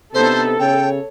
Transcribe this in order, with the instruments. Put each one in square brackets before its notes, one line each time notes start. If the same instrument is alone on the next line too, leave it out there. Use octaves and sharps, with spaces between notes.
[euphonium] C3 [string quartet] B3 D4 D#4 [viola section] A4 [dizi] C5
[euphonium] C#3 [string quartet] C#5 [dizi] G5